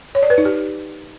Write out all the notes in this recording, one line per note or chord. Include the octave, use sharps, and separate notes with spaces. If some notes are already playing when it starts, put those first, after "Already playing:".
C#5
D5
B4
D#4
G4